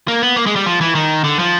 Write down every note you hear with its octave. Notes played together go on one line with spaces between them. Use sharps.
A#3
B3
A#3
G#3
G3
F3
E3
D#3
D3
F3